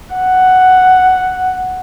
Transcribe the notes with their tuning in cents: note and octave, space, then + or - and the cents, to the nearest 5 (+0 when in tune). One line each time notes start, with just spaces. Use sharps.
F#5 +5